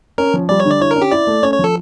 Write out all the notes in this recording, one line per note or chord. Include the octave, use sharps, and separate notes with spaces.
C#4 A#4
F3
G3 D5
C#5
D3 D5
E4 C#5
A#4
C#4
G4
E4 D5
A3
C#4 C#5
C#5
F3 A4